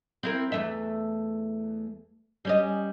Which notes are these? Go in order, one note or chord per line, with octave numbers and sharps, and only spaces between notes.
C4 E4 A#4
E2 A3 E5
G3 C#4 D#5